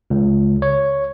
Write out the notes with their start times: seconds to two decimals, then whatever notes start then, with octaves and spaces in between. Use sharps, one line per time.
0.10 C#2
0.62 C#5